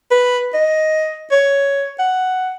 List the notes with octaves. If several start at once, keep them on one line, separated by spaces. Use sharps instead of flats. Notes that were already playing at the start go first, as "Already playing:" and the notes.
B4
D#5
C#5
F#5